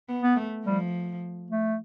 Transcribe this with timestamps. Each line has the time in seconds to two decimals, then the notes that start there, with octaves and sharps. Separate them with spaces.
0.08 B3
0.23 B3
0.36 A3
0.65 F3 G3
1.50 A3